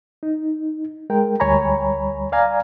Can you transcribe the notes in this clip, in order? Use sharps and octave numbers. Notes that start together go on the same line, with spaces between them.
D#4
G#3 A#4 G5
D2 G3 C#5 G#5 A#5 B5
D5 F5 G#5 A#5